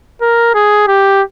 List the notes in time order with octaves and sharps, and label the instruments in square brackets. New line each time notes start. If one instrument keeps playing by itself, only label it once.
[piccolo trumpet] A#4
G#4
G4